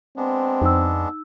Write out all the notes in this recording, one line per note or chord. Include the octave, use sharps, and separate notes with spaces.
G#3 B3 C4 D4
F2 D#4 E6